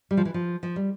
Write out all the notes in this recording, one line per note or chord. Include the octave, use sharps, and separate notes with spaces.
G3
F3
E3
F3
F3
G3